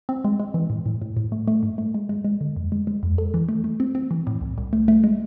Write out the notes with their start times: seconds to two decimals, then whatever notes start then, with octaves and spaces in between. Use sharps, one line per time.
0.09 C4
0.24 G#3
0.40 G#3
0.54 E3
0.70 A2
0.86 A2
1.02 A2
1.17 A2
1.32 A3
1.48 A3
1.63 G#2
1.78 A3
1.94 G#3
2.09 G#3
2.24 G#3
2.41 D3
2.56 F2
2.72 G#3
2.87 G#3
3.03 F2
3.18 A4
3.34 E3
3.49 A3
3.64 A3
3.80 C4
3.95 C4
4.11 E3
4.27 A2
4.41 C2
4.58 C2
4.73 A3
4.88 A3
5.04 G#3